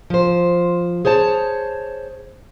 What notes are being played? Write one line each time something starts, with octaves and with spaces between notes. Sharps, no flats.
F3 C5
G#4 C5 C#5 A5